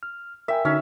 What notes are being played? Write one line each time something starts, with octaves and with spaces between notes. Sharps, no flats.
F6
A#4 E5 G5 G#5
D3 C#4 D#4 F#4